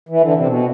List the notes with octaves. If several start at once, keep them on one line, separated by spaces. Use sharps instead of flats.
E3
D3
C3
B2